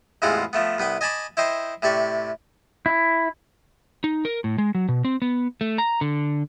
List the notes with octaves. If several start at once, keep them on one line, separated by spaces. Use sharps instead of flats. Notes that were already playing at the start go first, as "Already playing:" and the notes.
A1 E2 G#3 C4 F4 F#5
F3 A3 B3
C2 B3 B4 G5
D#5 G#5 A5 B5 D6
E4 C5 D#5 G5
A2 C3 G4 D5 C#6
E4
D#4
A#4
A2
G#3
F#3
B2
C4
B3
A3
A#5
D3